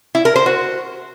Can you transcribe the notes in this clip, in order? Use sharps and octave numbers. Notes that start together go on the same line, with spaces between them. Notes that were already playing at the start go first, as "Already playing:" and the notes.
E4
A#4
C5
F#4